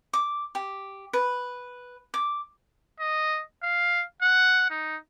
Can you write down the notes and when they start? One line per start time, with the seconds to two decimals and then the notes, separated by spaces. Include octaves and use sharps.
0.13 D6
0.55 G4
1.13 B4
2.14 D6
3.00 D#5
3.63 F5
4.22 F#5
4.71 D#4